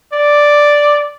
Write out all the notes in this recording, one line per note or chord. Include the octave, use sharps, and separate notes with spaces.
D5